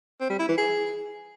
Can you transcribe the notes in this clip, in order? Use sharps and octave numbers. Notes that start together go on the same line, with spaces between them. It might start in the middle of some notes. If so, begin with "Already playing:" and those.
C4
G3
E4
E3
G#4